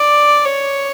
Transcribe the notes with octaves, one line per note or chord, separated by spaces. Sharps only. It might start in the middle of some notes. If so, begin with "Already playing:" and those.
Already playing: D5
C#5